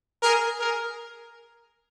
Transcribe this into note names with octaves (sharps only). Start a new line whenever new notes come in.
G#4 A#4
G#4 A#4